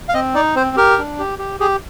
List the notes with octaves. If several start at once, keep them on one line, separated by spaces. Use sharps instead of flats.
F5
C4 D#5
D#4 D5
C4 C5
G4 A#4
D4
G4
G4
G4 G#4